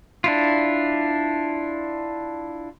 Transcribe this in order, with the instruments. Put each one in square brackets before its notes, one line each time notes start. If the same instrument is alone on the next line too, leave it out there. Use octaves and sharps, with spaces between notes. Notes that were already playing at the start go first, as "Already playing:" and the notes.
[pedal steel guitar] D4 E4 F4